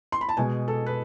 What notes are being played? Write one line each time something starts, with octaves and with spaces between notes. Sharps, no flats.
C6
B5
A5
B2 G#3 G#5
A4
B4